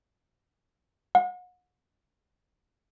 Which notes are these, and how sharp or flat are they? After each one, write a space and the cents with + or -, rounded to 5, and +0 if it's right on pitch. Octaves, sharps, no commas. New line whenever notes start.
F#5 -35